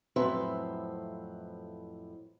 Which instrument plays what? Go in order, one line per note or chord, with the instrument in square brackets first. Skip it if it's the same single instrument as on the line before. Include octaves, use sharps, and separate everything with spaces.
[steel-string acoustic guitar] F2 A2 F#3 B4 C5 E5